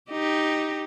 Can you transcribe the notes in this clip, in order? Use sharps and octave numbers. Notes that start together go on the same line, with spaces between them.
D#4 G4